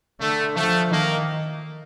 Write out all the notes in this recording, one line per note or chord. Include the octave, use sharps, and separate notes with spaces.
D3 A3
F3 A3
D#3 A#3